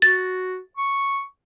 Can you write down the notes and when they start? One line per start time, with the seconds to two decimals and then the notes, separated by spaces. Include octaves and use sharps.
0.02 F#4 A6
0.77 C#6